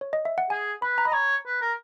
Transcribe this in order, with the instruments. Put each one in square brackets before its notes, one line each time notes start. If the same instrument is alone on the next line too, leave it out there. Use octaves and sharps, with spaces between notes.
[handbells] C#5
D#5
E5
F#5
[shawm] G#4 [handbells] G#5
[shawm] B4 [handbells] B5
[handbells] A#5
[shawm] D#5 [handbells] B5
[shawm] C#5 [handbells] A#5
[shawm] B4
A#4